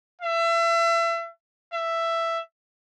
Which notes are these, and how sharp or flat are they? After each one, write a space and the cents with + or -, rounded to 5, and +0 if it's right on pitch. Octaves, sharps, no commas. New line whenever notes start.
E5 +30
E5 +10